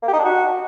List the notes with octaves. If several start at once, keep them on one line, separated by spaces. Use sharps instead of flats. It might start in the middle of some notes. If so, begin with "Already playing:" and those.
A#3
G4
D#4
D4
F#4